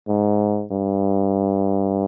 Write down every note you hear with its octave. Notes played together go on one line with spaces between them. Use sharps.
G#2
G2